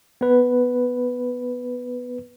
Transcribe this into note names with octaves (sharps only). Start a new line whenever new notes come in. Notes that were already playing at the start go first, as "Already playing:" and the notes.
B3 B4